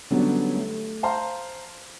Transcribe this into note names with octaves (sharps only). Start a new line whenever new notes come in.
D3 F#3 G3 B3 C#4 D4
A3
C5 F5 A5 A#5 C6